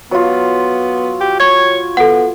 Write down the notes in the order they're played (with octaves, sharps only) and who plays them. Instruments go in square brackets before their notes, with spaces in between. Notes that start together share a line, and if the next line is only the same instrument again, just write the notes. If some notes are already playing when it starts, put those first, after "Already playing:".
[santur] F#3 F4 [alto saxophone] B3
[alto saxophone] G4
[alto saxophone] C#5 [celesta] C#6 G#6
[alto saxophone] B3 [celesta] A4 F#5